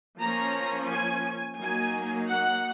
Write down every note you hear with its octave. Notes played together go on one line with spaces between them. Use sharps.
F3 A#3 C#4 A#5
G#5
F#3 A#3 D#4 G#5
F#5